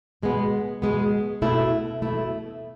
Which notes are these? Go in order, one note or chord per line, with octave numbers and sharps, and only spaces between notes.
B2 G#3 B3
B2 G#3 B3
B2 A3 E4
B2 A3 E4